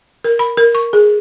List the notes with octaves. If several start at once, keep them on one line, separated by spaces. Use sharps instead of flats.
A#4
B5
A#4
C#6
G#4